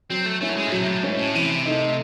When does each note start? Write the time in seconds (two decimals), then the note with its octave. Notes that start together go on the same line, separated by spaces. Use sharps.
0.10 F#3 C4
0.26 A3
0.41 A3 C#4 E4
0.49 F#3
0.57 G#3
0.68 G#2
0.72 A2 F#3
0.82 C3
0.88 A2
1.03 G#2 C#4 E4
1.19 A2
1.34 C3 E3
1.66 A3 D#4